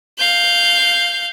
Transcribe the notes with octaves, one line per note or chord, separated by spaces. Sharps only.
F5 G6